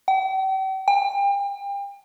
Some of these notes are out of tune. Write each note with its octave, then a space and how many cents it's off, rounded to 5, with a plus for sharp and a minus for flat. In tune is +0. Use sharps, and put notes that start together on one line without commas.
G5 -45
G5 +35